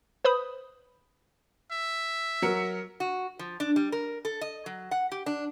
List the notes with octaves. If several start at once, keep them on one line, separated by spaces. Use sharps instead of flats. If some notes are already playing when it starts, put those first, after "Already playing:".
B4 C5 B5 D#6
E5
F#3 A#4 C#7
F#4
F3
D4
G3
A#4
A4
D#5
F#3
F#5
G4
D4